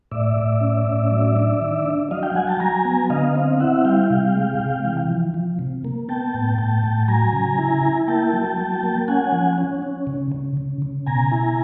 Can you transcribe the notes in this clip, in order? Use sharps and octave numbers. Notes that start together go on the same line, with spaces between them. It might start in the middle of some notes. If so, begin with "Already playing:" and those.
A2 D5 E5
A2
C#4
A2
F#3
D4
D#3
D4
F#3 D#5 F5
F5 G5
F#3 F#5 G#5
G5 A5
F#3 G#5 A#5
B3
D3 D#5 F5
C4
E4 E5 F#5
G3 F5 G5
C3
G#3
C3
E3
F3
F3
C3
A#3
B3 G5 A5
A2
A2 G5 A5
A2
F#3 G#5 A#5
C#3
E4
E4
A#3 G5 A5
F#3
F#3
A#3
C#4 F#5 G#5
F3
C#4
C#4
C#3
C#3
C#3
C#3
B2 G#5 A#5
E4